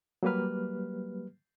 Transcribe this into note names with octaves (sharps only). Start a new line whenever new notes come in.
F#3 G3 A#3 G4 B4 F6